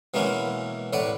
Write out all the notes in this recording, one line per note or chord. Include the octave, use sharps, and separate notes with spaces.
B2 E3 G#3 A#3 B3 C#4
A1 A2 B4 D5 F#5